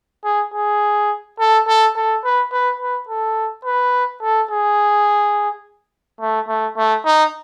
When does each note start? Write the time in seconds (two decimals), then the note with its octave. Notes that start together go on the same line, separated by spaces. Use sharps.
0.25 G#4
0.53 G#4
1.39 A4
1.67 A4
1.96 A4
2.24 B4
2.52 B4
2.80 B4
3.08 A4
3.65 B4
4.22 A4
4.51 G#4
6.20 A3
6.48 A3
6.77 A3
7.05 D#4